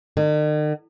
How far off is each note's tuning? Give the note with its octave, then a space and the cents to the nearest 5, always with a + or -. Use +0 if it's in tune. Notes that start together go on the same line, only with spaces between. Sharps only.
D#3 -45